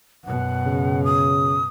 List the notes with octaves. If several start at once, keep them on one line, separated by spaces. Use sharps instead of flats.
F#2 B2 F#5
C#3
D#6